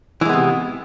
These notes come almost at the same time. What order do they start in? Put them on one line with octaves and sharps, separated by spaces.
E3 G#3 B3 C3